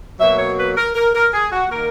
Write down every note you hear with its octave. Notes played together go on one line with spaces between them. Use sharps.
B2 F#3 A#3 E5
C#5
B4
A#4
A#4
A#4
G#4
F#4
D#3 A#3 A#4